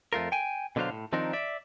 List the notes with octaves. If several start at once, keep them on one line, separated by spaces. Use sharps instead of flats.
F2 A3 F4 A#4
G5 G#5
B2 D3 F#3 D4 C5 F5
A2
D#3 F3 C4 D4 D#4 A#4
D5 E5